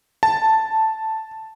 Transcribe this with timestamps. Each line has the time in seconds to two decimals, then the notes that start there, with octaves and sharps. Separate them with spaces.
0.23 A5